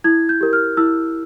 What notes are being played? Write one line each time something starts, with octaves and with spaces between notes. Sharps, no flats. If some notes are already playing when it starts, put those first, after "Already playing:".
E4 G#6
G6
G4 A#4
F6
E4 E6